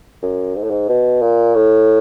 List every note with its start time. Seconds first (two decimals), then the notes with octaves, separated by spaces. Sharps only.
0.23 F#2
0.56 G#2
0.63 A2
0.70 G#2
0.89 B2
1.22 A#2
1.55 A2